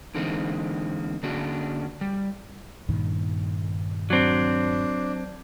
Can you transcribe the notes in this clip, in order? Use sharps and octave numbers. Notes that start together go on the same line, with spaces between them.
D3 E3 G#3 A#3 C4 D#4
D3 A#3 C#4 D4 F#4 G#4
G3
G2 A#2 D#3
F#3 C4 D4